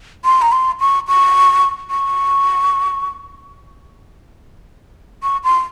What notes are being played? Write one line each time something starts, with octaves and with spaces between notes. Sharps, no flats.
C6
A#5
C6
C#6
C#6
C#6
C#6
C6